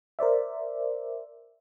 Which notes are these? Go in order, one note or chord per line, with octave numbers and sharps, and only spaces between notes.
A#4 C5 D5 E5